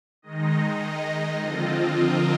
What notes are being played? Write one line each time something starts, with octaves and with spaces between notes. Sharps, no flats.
D#3 G#3 D#4 D#5
D3 F3 C4 F4
A#4